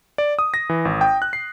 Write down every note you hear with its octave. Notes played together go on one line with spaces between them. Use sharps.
D5
D#6
A#6
E3
G#1
G5
F#6
C7